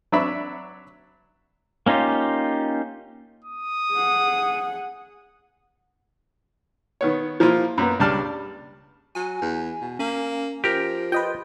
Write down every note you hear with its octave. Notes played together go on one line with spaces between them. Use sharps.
F#3 D4 E5 B5 C#6
A#3 C#4 D#4 F4 G4
D#6
G#4 F#5
D#3 B3 C#5
F3 A#3 E4 F4
F#2 A#3 B3
C#2 G3 D4 A5 F6
F#3 G#5
E2
B2
A#3 C#4
F3 G4 A#4
F4 B4 D#5 G5